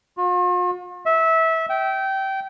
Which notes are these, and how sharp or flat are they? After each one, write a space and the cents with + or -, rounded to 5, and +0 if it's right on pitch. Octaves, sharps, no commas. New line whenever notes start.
F4 +45
E5 -20
G5 -20